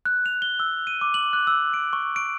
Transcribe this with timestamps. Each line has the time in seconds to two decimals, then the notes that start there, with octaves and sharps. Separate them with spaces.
0.05 F#6
0.26 F7
0.42 G7
0.60 E6
0.87 D#7
1.01 D6
1.14 F#7
1.33 F#6
1.47 E6
1.74 D7
1.93 C#6
2.16 D7